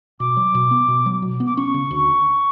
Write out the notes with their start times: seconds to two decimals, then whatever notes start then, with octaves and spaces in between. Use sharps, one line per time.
0.20 B2 D6
0.37 F#3
0.55 B2
0.71 B3
0.88 B2
1.06 F#3
1.22 B2
1.40 B3
1.47 D6
1.56 C#4 C#6
1.74 C#3
1.91 D2